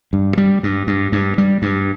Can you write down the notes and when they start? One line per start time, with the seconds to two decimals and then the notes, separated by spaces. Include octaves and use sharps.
0.13 G2
0.38 G3
0.63 G2
0.87 G2
1.12 G2
1.38 G3
1.62 G2